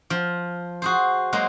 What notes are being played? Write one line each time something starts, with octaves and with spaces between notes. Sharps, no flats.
F3
F#4 G#4 C5
F#3 G#3 A#3 C5